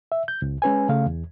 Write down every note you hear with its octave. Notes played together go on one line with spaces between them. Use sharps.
E5
G6
C#2
G#3 C#4 B4 G#5
C#3 A3 F5
E2